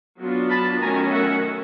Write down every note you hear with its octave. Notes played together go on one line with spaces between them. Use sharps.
F#3 B3 D4 F4
A5 B5
D#3 F#3 A3 C#4 G#5 A#5
E5 F#5